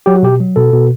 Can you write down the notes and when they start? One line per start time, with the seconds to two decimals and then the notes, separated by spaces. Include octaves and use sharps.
0.06 F#3 G4
0.16 F#4
0.23 B2 G4
0.40 F#3
0.56 B2 A4
0.73 B2